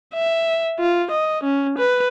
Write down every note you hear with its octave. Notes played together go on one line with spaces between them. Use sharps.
E5
F4
D#5
C#4
B4